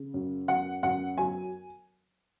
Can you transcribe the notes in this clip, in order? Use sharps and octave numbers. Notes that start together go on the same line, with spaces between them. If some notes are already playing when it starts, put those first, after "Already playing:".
Already playing: C#3
F#2
F#2 F#5
F#2 F#5
F#3 G#5